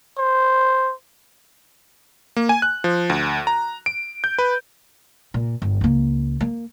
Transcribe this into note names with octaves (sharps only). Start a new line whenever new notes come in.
C5
A#3
G#5
F#6
F3
D2
A#5
D7
G6
B4
A#2
G1
C#2 A#3
A#3